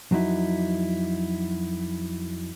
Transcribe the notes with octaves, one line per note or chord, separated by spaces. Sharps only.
F2 F#3 D#4 E4